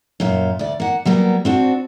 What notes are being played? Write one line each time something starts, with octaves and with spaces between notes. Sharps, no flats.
F#2 A#2 F4
D2 D5
A#3 F#5
F#3 G3 A#3 B3
C4 D4 F#4